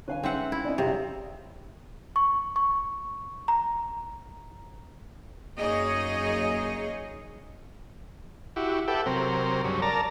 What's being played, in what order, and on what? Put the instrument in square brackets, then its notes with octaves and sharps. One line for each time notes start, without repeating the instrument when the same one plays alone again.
[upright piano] D3 C#5 [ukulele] B4 F5 G#5
[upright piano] G#3 C#4 D#4 [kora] C4 E5 F#5
[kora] E4
[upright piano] C4 D4 [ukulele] D5 D#5
[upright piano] F#2 C#5 A#5 [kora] C3 [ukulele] G#4 F5
[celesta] C#6
C#6
A#5
[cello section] F#2 A#3 D#4 G#4 C#5 D#5
[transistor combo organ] E4 F#4 G4
G4 A4 B4 E5 F#5 G5
C3 F#3 C4 A#4
G2 C#3 F#3
A#4 D5 A5 A#5